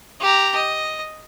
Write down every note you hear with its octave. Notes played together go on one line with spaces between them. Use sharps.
G4 A#5
D#5